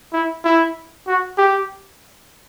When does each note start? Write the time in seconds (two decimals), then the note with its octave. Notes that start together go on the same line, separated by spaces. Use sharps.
0.13 E4
0.44 E4
1.07 F#4
1.38 G4